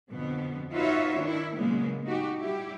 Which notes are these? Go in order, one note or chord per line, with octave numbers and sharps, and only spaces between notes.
F2 B2 D3 B3
D#4 F4 F#4 B4 C#5 E5
D#3 D4 E4
A#2 C#3 F#3 G#3 A#3 B3
D#4 F#4 G4
G3 E4 G4